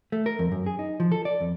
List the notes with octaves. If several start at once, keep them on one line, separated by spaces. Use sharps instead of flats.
A3
A#4
F2
F#2
G#4
D#4
F3
A4
D5
F2